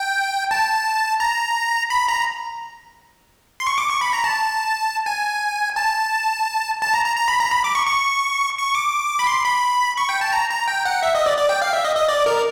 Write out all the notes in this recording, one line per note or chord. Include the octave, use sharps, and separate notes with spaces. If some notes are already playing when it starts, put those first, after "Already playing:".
Already playing: G5
A5
A#5
B5
A#5
C6
C#6
D6
C#6
B5
A#5
A5
G#5
A5
A5
A#5
A#5
A#5
B5
A#5
B5
D6
C#6
C#6
C#6
D6
B5
C6
B5
C#6
G5
A5
A#5
A#5
G5
F#5
E5
D#5
D5
D5
G5
F5
E5
D#5
D#5
D5
A#4